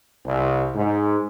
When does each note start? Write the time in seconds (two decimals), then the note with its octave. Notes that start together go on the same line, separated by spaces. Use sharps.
0.24 C2
0.75 G#2